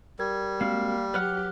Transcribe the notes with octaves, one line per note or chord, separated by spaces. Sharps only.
G3 A#4 G#6
G#3 A#3 C4 F#4 F5 F6 C7
F#3 G4 B4 C#5 F#5 F6 F#6